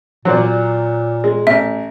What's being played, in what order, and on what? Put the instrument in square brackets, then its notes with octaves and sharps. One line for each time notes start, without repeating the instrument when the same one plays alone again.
[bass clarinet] A#2 [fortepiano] F#3 C5 D5
[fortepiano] G#3
[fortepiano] A1 [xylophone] E5